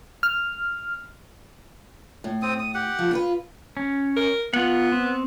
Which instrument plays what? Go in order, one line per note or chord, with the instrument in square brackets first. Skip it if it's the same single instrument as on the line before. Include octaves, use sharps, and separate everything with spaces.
[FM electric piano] F6
[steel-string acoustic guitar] A2
[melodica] C4 D#6
D#6
G4 F#5
[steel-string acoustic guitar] F3
F4 A#4 B4
[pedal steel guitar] C#4
[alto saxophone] A#4
[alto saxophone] B3 [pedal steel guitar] F4 F#5
[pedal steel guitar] C4